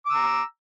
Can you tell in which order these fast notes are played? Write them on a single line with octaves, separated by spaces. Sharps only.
D6 E6 A#5